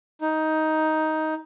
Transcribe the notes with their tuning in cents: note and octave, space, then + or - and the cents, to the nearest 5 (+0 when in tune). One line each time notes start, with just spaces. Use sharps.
D#4 +10